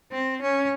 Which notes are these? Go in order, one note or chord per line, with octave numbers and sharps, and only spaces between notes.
C4
C#4